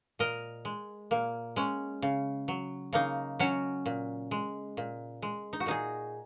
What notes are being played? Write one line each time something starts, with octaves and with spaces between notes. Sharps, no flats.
A#2 A#4 D#5
G#3
A#2 A#3
G#3 C#4
C#3
F#3
C#3 A#3 D#4
F#3 C#4 F#4
A#2
G#3
A#2
G#3
D#4
F#4
A#2 D#4 G#4